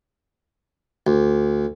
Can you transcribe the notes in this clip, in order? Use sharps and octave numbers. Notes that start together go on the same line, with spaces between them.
D2